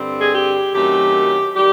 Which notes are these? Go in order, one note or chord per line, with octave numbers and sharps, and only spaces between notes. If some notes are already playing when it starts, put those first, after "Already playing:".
Already playing: G2 D3 G3 C4
G#4
G4
F#2 D#3 F#3 A3 C4 G4
D#3 G3 G4